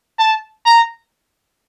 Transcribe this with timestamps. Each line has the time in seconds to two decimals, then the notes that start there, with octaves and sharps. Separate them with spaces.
0.19 A5
0.66 A#5